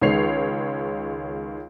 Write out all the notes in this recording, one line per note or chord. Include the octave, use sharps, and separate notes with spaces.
C#2 D#3 G#3 C#5 C7 F7